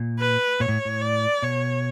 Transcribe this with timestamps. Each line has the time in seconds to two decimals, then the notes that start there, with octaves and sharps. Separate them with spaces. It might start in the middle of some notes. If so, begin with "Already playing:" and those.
Already playing: A#2
0.19 B4
0.60 A#2 C#5
0.68 A2
0.85 A2
1.01 D5
1.42 B2 C#5